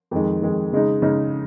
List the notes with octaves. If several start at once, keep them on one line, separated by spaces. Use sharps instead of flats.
F2 D#3 G#3
F2 D#3 G#3
C#3 G#3 D#4
C#3 G#3 D#4